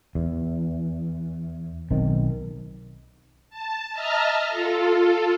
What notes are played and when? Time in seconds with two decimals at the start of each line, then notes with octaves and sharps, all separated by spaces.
0.15 E2
1.91 B1 D#3 C4
3.50 A5
3.93 D#5 E5 A5 A#5 F6
4.49 F4 A4